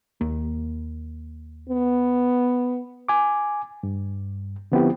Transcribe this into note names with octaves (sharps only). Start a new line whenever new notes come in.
D#2 A#3
B3
G#5 D6
G2
D3 F3 B3 C4 E4 G4